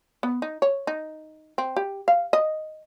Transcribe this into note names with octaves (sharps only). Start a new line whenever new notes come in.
B3
D#4
C#5
D#4
C4
G4
F5
D#5